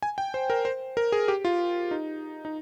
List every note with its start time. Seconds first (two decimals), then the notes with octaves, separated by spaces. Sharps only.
0.03 G#5
0.18 G5
0.34 C5
0.50 A#4
0.65 C5
0.97 A#4
1.12 G#4
1.28 G4
1.45 F4
1.91 D#4
2.45 D#4